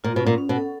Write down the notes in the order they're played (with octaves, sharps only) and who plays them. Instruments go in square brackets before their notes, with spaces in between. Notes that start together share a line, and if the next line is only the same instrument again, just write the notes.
[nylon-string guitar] A#2 [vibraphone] F4
[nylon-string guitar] B2 [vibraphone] C#4
[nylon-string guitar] A#2
[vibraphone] C#4
[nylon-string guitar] B2
[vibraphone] A4